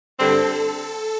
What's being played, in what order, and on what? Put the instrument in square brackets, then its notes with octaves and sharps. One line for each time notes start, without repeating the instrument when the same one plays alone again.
[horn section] G2 D3 G3 C4 [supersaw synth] A4